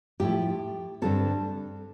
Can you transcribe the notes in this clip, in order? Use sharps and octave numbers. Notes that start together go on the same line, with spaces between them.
A2 F3 A3 E4 G4
G2 D3 G3 C4 A4